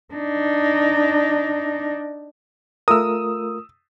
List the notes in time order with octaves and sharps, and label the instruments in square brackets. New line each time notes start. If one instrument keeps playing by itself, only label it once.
[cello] D4 D#4
[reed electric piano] A3 F4 A#4 [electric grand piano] D#6 E6